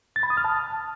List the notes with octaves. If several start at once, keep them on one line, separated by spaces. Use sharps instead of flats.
A6
B5
D#6
F6
A5